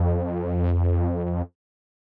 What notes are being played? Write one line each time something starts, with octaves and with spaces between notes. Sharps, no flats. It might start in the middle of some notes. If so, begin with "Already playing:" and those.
Already playing: F2